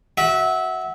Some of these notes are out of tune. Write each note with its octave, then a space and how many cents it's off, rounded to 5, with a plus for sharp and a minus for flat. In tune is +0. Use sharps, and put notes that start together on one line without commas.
F#4 +0 E5 -20